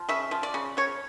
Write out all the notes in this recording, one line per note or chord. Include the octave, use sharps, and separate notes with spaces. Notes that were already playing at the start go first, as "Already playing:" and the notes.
Already playing: F3
C#3 E5
F3
D5
C#3
C#3 C#5